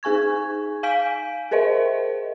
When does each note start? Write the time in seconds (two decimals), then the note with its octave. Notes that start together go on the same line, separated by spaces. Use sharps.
0.03 D#4 G#4 G#5 C#6 G#6
0.83 F5 G#5 G6 B6 D7
1.51 G#4 A#4 C5 D#5 E5